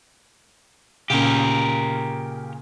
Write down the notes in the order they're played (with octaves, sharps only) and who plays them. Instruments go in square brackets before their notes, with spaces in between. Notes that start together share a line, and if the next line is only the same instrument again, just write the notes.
[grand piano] A#2 C#3 [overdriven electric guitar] G4 A#4